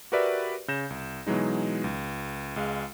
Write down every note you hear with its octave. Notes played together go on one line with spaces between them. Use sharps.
F#4 G4 A#4 B4 D5 E5
C#3 G6 A#6 E7
C2
B2 E3 F#3 G#3 D#4
C#2
C#2 G#3 F5